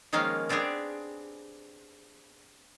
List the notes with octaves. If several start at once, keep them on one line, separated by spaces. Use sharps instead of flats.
D#3 F3 G#3 A#3 C#4 F5
B3 C4 D4 G4 G#4